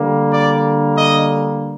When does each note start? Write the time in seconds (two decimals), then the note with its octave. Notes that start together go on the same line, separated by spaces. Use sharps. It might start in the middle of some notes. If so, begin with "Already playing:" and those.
Already playing: D3 G3 A#3
0.32 D5
0.97 D#5